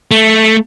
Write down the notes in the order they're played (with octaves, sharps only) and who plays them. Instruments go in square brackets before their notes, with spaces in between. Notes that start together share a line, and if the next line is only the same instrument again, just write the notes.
[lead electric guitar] A3